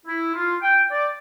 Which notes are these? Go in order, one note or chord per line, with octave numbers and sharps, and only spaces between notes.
E4
F4
G5
D5